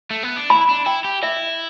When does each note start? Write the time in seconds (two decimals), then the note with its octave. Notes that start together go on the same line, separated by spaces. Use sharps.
0.11 A3
0.23 B3
0.36 D4
0.50 E4 B5
0.69 D4
0.86 E4 G5
1.05 G4
1.23 E4 E5